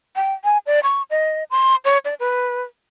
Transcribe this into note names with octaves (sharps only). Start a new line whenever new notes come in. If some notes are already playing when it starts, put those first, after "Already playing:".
G5
G#5
D5
C#6
D#5
C6
C#5
D5
B4